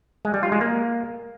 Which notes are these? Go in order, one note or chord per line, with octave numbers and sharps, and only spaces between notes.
G#3
G3
F4
G#3
A#3